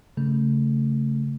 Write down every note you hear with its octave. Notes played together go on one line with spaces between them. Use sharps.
C#3 A3